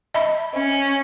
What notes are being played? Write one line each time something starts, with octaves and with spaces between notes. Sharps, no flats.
D#5 E5 B5
C#4